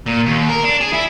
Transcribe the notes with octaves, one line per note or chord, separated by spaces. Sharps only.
A#2
D#2
A#4
D4
G#4
E4